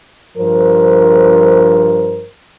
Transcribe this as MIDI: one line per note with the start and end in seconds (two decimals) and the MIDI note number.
0.37 2.27 43
0.37 2.27 53
0.37 2.27 70
0.37 2.27 72